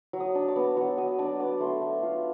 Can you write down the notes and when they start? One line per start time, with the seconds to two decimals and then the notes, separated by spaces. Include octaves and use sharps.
0.13 F#3
0.20 D#6
0.35 D4
0.48 D6
0.56 B3
0.77 F#3 C#6
0.98 F#3 D#6
1.19 D4 D6
1.40 B3 D6
1.61 A3 C6
1.81 A3
2.03 F4